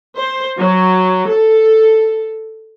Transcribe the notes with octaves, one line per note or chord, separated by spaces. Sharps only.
C5
F#3
A4